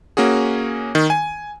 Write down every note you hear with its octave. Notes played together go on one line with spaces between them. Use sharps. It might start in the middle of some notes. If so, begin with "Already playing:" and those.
A#3 C#4 F#4 G#4
D#3
G#5